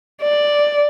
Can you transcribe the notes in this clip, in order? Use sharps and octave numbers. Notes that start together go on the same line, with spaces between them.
D5